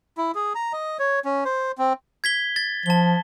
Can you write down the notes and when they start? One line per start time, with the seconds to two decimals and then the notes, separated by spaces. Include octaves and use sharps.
0.17 E4
0.35 G#4
0.55 A#5
0.73 D#5
0.99 C#5
1.25 C#4
1.45 C5
1.78 C4
2.24 G#6 B6 G7
2.56 A6
2.86 F3 A5 G7